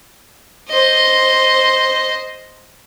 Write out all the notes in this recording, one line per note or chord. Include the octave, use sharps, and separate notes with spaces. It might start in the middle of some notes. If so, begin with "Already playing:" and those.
C5 D#5